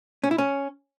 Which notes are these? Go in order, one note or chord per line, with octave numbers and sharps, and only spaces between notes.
C#4
E4
C#4